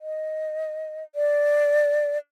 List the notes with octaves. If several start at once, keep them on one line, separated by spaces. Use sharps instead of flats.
D#5
D5